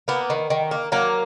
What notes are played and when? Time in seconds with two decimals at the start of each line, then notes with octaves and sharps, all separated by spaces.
0.08 A#3 B3
0.30 D#3
0.50 D#3
0.71 A#3
0.92 F#3 A#3